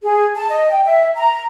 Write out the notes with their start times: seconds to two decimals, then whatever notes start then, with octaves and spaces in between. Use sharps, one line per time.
0.02 G#4
0.36 A5
0.50 D#5
0.70 G5
0.85 E5
1.16 A#5